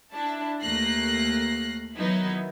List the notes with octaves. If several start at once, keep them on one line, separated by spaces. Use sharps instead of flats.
D4 E4 A5
D#2 A3 A#3 F#6 A#6 C7
D#3 F#3 B3 D#4 E4